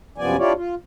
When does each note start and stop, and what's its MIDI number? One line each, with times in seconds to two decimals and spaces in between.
0.18 0.36 42
0.18 0.36 48
0.18 0.36 53
0.18 0.36 59
0.18 0.36 74
0.18 0.36 80
0.38 0.53 62
0.38 0.53 64
0.38 0.53 65
0.38 0.53 67
0.38 0.53 73
0.38 0.53 74
0.56 0.75 65